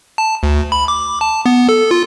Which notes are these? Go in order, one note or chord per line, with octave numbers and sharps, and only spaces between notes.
A5
D2
B5
D6
A5
B3
A4
F4